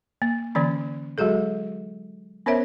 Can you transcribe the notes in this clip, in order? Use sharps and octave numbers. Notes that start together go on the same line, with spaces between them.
A#3
D3 E3 A#3 C#4
F#3 G#3 F#4 G#4 A4
B3 C#4 A#4 C5 C#5 E5